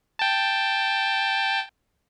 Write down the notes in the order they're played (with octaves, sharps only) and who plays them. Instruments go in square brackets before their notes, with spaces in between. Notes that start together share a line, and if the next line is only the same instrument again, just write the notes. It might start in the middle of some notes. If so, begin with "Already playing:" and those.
[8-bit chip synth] G5 A5